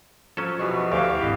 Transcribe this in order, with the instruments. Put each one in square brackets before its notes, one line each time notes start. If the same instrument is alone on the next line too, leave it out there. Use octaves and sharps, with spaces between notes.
[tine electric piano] F3 [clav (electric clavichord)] F#3 C#4 A4 [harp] F5
[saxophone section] E2 G2 B2 [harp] B4 F#5 C#6
[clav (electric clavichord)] D2 [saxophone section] E3 G4 F5 [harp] C#6
[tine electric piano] G#1 E4 D#5 [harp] G#4 A4